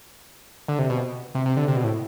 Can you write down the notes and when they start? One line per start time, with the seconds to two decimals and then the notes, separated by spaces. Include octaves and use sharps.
0.68 D3
0.79 C3
0.90 B2
1.35 C3
1.46 C3
1.57 D3
1.68 C3
1.76 B2
1.84 A2